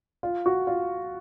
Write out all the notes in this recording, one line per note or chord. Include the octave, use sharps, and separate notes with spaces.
F4
F#4
F4